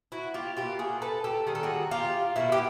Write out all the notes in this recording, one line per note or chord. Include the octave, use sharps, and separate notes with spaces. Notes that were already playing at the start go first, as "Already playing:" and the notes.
E4 F#4
F4 G4
B2 F#3 A#3 F4 G4
F#4 G#4
A4 B4
G4 A4
D#3 G3 A#3 G#4
A4
F#4 G#4
F4 G4
B2 F#3 A#3 E4 F#4
G4